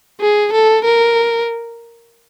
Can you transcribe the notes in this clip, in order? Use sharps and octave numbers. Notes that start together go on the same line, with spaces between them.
G#4
A4
A#4